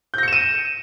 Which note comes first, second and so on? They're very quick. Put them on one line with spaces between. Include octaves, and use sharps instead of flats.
G6 A#6 C#7 E7 D#7